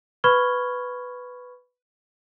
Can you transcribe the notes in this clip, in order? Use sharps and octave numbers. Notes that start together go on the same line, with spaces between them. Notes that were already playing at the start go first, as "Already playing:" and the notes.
B4 B5 C#6 F6 G#6 G7